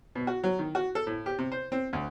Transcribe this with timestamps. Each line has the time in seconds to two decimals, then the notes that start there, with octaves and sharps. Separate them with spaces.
0.15 B2
0.27 F#4
0.44 F#3
0.59 D#3
0.75 F#4
0.95 A4
1.07 A2
1.26 G4
1.39 C3
1.52 C5
1.72 C4
1.93 D2